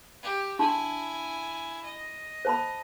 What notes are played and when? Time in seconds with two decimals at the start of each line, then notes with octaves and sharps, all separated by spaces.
0.23 G4
0.59 D4 E4 G#5 A5 C6
1.84 D#5
2.45 C5 A5 B5